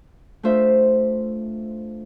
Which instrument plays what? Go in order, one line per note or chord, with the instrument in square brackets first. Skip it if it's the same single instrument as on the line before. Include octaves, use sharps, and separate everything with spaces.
[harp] A3 D4 F4 C5 E5